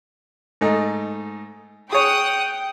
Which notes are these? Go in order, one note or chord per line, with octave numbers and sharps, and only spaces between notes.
G#2 A3 D#4
G#4 C#5 F#5 G5 D#6